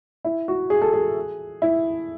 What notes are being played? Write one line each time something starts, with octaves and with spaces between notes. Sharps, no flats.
E4
F#4
G#4
A4
G#4
E4